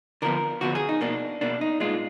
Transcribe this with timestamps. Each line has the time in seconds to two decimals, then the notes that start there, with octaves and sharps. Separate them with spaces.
0.22 D3 F3 B3 A#4
0.61 D3 F3 B3 F#4
0.75 G#4
0.89 D#4
1.01 B2 A#3 D4
1.41 B2 A#3 D4
1.61 D#4
1.80 A#2 G#3 B3 F4